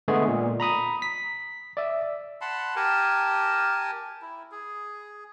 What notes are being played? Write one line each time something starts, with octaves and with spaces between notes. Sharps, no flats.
D3 G#3 A3 B3 G#4
A#2
A#5 B5 D#6
B6
D5 E5
F#5 A5 B5 C6
G4 A#4 G#5 A5
E4
G#4